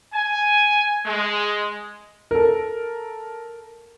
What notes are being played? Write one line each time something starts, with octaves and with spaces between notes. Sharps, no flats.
G#5
G#3
A4 A#4